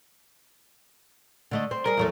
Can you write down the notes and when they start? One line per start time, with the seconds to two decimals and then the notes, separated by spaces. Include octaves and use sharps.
1.51 D3 A3 D#5
1.71 C4
1.86 G3 G#4 A#4
1.97 E2 F#3 A3